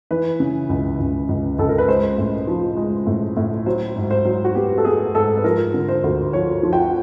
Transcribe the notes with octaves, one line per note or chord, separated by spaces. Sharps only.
E3 B4
C#3
C#2
C#2
C#2
C#2 A4
A#4
B4
G#3 C5
A2
F3
G#3
A2
A2
F#3 C5
G#2
C5
F#3
F#4
B3 G4
A4
B3 G#4
G#2 A4
B4
F3 A#4
D3
C5
D2
F3 C#5
F3
G5
F#5